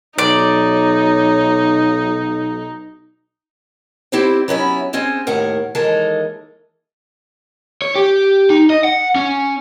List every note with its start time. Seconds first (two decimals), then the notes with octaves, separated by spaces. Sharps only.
0.19 B1 D#4 C#5 D5
4.12 C4 E4 G4 C5 D5
4.48 F#3 B3 C#4 E4
4.93 C4 C#4 G#4 C5
5.27 D#2 A2 A#4 F#5
5.75 D#2 E3 G#3 A4 A#4 A5
7.82 C#5
7.95 G4
8.50 D#4
8.70 D#5
8.84 F#5
9.15 C#4